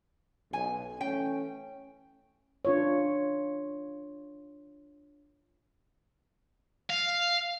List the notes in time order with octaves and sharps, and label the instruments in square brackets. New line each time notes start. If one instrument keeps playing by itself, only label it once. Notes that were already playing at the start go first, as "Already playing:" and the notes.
[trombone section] B1 [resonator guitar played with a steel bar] G#5
[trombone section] E3 A3 C#4 [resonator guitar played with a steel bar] G5
[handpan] D4 F4 C#5
[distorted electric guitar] F5